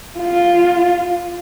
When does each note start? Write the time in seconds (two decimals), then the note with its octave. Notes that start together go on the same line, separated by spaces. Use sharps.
0.19 F4